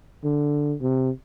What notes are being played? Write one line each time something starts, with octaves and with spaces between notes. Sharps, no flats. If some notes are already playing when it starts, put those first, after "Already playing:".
D3
C3